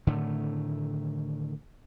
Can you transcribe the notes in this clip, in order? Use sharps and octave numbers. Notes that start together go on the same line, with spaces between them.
A2 D3 D#3 A3